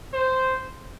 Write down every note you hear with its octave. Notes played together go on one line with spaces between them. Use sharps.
C5